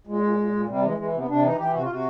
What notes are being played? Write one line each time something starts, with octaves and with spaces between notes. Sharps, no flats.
A#2 G#3
A#2
A#2
A#2
C3 G3
E3 G#3
E3 G#3
C3
B3
C3 D4
E3 D#4
E3 G4
C3 F#4
F4
C3 F#4